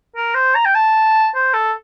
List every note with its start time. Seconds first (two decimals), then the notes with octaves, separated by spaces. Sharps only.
0.16 A#4
0.35 C5
0.55 A#5
0.65 G5
0.75 A5
1.35 C5
1.54 A4